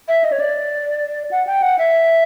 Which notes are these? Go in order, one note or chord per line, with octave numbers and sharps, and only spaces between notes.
E5
D#5
C#5
D5
F#5
G5
F#5
E5